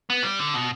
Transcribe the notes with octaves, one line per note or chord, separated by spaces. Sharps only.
B3
G3
D3
B2